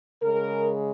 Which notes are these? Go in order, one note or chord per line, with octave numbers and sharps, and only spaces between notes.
C#3 G#3 A#4